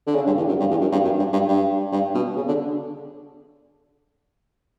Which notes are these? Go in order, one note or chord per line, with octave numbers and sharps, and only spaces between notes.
D3
C#3
G2
E2
F#2
G2
E2
F#2
G2
F#2
G2
G2
G2
G2
B2
C#3
D3